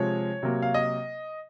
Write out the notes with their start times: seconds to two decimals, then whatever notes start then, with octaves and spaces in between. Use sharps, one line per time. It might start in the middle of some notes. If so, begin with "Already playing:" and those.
Already playing: C3 F3 G#3 C#5
0.43 C3 F#3 A#3
0.62 F5
0.74 D#5